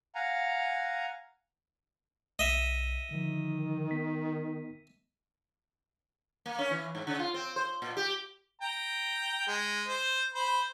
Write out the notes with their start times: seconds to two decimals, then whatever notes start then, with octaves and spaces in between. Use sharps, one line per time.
0.15 F5 F#5 G#5 A#5
2.39 B1 D#5 E5
3.11 D3 D#3 F3
3.91 B3 B6
6.46 A#3
6.59 C#4
6.71 E3
6.95 G#2
7.07 C#3
7.19 F4
7.34 C4
7.56 C5
7.82 A#2
7.97 G4
8.62 G5 A#5
9.48 G#3
9.88 C5
10.35 C5 B5